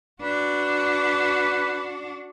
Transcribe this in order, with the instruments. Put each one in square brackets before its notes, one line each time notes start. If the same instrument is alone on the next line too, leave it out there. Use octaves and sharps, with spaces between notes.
[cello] D4 F#4 [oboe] B4